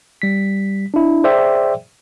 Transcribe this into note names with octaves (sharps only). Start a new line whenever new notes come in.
G3 B6
D4 E4
G#4 C5 D5 E5 G5